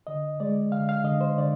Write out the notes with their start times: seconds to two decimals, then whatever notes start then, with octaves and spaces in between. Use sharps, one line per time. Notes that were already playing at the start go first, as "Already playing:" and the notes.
0.07 D3 D#5
0.40 G#3 D5
0.72 D3 F5
0.89 F5
1.04 D3 D#5
1.21 C5
1.38 D3 D5